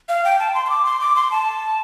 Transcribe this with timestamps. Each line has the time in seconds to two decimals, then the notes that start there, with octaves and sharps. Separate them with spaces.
0.09 F5
0.24 G5
0.39 A5
0.54 C6
0.66 C6
0.70 D6
0.85 C6
1.01 D6
1.16 C6
1.31 A5